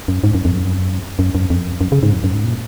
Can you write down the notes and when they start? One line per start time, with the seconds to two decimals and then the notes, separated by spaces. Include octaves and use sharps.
0.08 F#2
0.24 G#2
0.35 F#2
0.45 F2
0.55 F#2
1.19 F#2
1.35 F#2
1.50 F2
1.81 F#2
1.92 C#3
2.03 G#2
2.13 F2
2.24 F#2
2.34 G#2
2.44 A#2